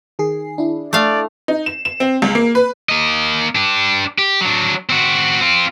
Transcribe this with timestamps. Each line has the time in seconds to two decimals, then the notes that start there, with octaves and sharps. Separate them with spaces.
0.19 D#3 G#4 C7
0.58 D4 E4
0.93 A3 D5 F5
1.48 D#4
1.66 E7
1.85 E7
2.00 C4
2.22 C#2
2.35 A#3
2.55 B4
2.89 A#3 D#5
3.55 D4 G4
4.18 G4
4.41 F#3 D4
4.89 C4 F#4
5.41 C4 F4